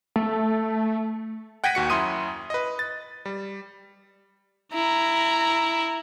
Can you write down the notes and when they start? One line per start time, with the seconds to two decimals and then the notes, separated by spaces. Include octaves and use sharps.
0.16 A3
1.64 F#5 G5 G#6 A#6 B6 D#7
1.75 D#2 F#4 C#7
1.90 F#2 E4 C6 D#6 D#7
2.50 B4 D#5
2.79 A6
3.25 G3
4.73 E4 A#5